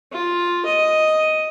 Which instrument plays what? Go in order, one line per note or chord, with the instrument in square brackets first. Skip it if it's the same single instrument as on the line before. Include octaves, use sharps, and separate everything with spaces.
[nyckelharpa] F4
D#5